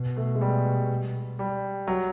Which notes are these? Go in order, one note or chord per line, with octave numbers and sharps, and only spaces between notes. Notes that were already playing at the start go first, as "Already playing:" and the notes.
Already playing: B2
A3
G#3
G3
G3
F#3